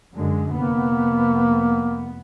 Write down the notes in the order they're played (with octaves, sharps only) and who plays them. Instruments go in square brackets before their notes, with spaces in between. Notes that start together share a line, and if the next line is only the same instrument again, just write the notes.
[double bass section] F#2 D3 G#3
[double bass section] F1 B3 [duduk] A#3